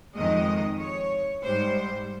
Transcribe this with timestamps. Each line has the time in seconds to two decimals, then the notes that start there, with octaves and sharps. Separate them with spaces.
0.14 F2 D#3 G#3 D#5
0.79 C#5
1.44 G#2 G3 C5